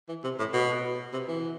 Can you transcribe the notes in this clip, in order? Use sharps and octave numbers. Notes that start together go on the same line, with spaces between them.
E3
C3
A2
B2
C3
E3